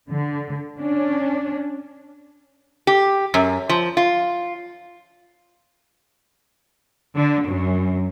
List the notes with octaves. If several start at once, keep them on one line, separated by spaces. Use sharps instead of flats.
D3
C#4 D4
G4
F#2
F3
F4
D3
F#2